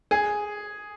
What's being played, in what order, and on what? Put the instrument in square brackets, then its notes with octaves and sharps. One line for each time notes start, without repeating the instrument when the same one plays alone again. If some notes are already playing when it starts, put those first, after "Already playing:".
[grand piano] G#4